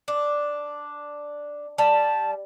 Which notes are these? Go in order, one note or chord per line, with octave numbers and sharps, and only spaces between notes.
D4
G3 A5